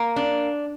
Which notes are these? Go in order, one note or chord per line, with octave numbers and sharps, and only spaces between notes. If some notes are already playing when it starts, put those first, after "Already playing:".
Already playing: A#3
D4